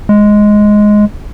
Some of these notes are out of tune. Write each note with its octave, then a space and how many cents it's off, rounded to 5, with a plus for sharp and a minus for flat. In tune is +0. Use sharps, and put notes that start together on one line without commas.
G#3 +5